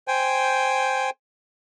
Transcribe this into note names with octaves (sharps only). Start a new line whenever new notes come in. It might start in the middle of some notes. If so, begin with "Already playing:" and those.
C5 G5 G#5